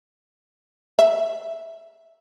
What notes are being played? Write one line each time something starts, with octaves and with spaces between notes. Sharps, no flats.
E5